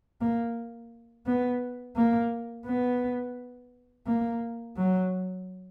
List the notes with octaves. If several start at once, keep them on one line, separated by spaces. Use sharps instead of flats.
A#3
B3
A#3
B3
A#3
F#3